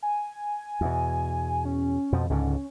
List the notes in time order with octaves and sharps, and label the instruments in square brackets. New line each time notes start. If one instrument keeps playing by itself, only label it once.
[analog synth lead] G#5
[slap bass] E2 B2
[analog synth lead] C#4
[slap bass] F2 B2 F3
[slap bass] C#2 G#2 D3 [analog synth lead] C#4